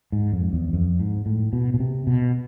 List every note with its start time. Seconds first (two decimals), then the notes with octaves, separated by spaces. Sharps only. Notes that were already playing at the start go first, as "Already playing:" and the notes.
0.12 G#2
0.33 F2
0.53 E2
0.73 F2
1.00 G#2
1.26 A2
1.53 B2
1.74 B2
1.80 C3
2.07 B2